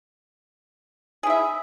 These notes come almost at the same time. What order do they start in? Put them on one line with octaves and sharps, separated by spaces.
G#4 E4 E5